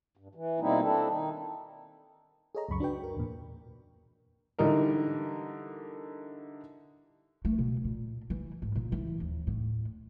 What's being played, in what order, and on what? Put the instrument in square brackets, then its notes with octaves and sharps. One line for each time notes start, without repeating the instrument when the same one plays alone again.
[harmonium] G2
E3
B2 G3 A#3 C4 D#4 E4
C4 D4 E4 A4
D#3 D#4
[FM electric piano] G#4 A4 C#5 D#5 A#5
C#2 F#2 B5 C#6
D4 F#4 B4 G5
A#4
E2 A#2
[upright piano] D3 E3 G3 D#4 A#4
[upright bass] A3
B2
A#2
E3
G#2
A#2
E3
D#2
A2